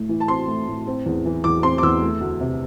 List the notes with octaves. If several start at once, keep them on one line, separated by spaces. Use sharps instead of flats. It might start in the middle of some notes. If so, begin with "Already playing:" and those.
Already playing: A2 A3
E3
A5
C4 C6
A3
A2
C4
E2
E3
E2 D6
C4 C6
D6
E2 E6
A3
D2
C3